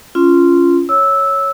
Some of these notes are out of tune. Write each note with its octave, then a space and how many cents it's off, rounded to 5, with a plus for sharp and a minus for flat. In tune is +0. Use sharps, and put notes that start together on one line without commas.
C#4 +10 F4 -15 C6 +0
C#5 +0 E6 -10